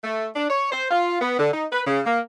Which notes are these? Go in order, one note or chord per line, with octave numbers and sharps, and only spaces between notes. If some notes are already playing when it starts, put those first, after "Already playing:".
A3
D4
C#5
C5
F4
B3
D3
D#4
B4
C#3
A#3